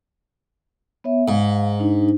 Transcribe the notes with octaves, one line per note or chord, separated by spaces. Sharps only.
B3 C#5 E5
G#2 F5
D4 D#4